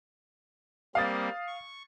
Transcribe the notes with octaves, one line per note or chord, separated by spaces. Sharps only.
G3 A#3 C4 F5 D#6 A6
C#6